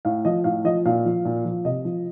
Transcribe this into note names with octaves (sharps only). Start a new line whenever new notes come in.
A2 F5
F3 D#5
A2 F5
F3 D#5
A#2 F5
F3
A#2
F3
C3 D#5
F3